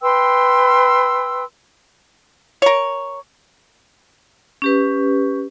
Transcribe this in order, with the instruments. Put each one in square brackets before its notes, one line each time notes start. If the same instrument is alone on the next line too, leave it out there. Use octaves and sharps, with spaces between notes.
[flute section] B4 G5 C6 E6
[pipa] A#4 C#5
[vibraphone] C#4 G4 B4